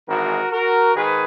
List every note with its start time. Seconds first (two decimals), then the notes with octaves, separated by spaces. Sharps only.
0.08 G#1 G#2 E3 F#4 A#4
0.52 F#4 A#4
0.95 G#2 D#3 G#4 B4